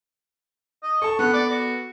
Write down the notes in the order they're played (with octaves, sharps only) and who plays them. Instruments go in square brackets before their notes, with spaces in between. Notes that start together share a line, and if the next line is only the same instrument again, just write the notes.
[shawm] D#5
[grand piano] A4 A5 [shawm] C#6
[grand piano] B3 A4 [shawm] F#5
[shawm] D5
F#4